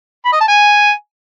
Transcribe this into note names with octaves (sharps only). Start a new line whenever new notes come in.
B5
D#5
A5
G#5